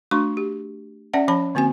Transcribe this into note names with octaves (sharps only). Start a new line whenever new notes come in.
A3 D4 F#4 C6 C#6
G4
C#4 D5 E5 F#5 A5
F3 C#4 A5 B5
D3 A#3 C4 F#4 G#5